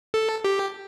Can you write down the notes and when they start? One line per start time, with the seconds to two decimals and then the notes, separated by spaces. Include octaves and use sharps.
0.14 A4
0.44 G4